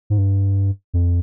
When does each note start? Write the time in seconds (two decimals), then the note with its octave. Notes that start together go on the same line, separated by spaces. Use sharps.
0.10 G#2
0.18 G2
0.94 F2